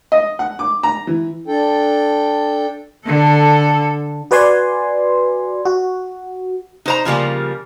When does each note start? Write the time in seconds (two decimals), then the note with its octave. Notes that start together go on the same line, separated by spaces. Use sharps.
0.12 D#5
0.39 F#5
0.59 D6
0.83 A#5
1.07 E3
1.47 D4 A4 G5
3.06 D3 A4
4.31 F#4 B4 D5 G#5 C6
5.65 F#4
6.86 D#4 C5 A#5
7.05 C#3 F3 G3 A#3